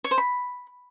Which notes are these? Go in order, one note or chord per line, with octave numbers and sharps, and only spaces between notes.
C#5
C5
B5